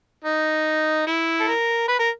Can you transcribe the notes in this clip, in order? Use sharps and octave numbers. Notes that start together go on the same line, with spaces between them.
D#4
E4
A4
A#4
B4
A#4